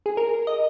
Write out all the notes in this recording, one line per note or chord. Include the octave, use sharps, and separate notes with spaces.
G#4
A#4
D#5